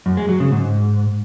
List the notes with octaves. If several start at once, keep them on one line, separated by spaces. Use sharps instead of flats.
F#2
G#3
F#3
C#3
G#2